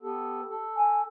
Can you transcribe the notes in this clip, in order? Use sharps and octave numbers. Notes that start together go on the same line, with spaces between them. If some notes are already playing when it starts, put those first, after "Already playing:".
B3 G4 A4
A4
G#5